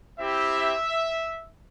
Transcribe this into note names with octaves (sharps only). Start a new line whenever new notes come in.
C4 E4 G4 E5